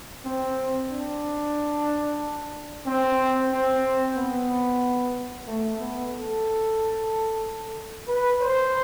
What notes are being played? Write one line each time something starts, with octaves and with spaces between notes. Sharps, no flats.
C4
D4
C4
C4
B3
A3
B3
A4
B4
C5